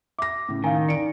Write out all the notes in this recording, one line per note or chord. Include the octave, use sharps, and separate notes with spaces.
E5 D6 A#6
A2 C#3
D#3 F5 G#5
D#4 D5 C#7 D7